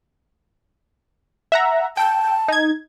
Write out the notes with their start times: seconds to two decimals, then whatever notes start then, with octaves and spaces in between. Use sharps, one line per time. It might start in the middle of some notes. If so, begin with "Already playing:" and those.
1.52 E5 F#5 A#5
1.97 G5 A5
2.48 D#4 G#6